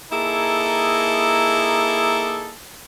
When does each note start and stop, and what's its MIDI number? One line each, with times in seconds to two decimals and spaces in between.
0.11 2.53 58
0.11 2.53 63
0.11 2.53 64
0.11 2.53 68
0.11 2.53 69